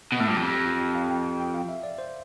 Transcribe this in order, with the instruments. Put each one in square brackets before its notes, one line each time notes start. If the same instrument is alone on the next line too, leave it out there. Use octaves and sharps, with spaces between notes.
[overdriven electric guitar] B2
A2
[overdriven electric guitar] G2 [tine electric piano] F4
[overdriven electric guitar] F2 [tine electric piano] G4
[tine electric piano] G4
F4
G4
F5
G5
G5
G5
F5
E5
D5
C5